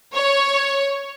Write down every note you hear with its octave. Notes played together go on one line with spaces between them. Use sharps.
C#5